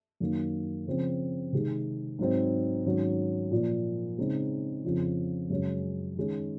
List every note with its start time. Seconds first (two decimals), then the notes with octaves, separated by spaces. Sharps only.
0.20 F#2 D#3 A#3
0.87 C#3 F3 C4
1.53 C3 D#3 G#3
2.19 G#2 F#3 C4 D#4
2.85 G#2 D#3 F#3 C#4
3.51 A#2 F3 A#3
4.18 C#3 G#3 C4 D#4
4.84 F2 C#3 F3 C4
5.50 F#2 C#3 G#3 C#4
6.16 D#3 G#3 C#4